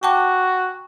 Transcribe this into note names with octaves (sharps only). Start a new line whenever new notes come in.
F#4 G5 A5 D6